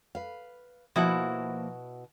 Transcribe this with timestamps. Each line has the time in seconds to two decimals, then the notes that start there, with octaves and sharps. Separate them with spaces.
0.15 B4 F5
0.96 B2 F3 A#3 E4 F#4 F#5